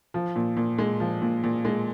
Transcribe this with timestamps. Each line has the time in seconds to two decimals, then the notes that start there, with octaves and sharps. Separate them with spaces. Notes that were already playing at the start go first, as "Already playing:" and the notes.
0.14 F3
0.36 A#2
0.57 A#2
0.78 G#3
1.00 F3
1.22 A#2
1.44 A#2
1.65 G#3